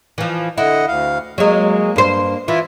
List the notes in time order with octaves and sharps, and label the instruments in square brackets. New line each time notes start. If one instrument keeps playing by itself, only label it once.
[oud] E3 F3
[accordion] D3 D#5 F#5 [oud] E4
[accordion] D2 F5
[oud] F#3 G#3 [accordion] A#3
[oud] G2 C5
[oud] E3 [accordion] E4 F4 E5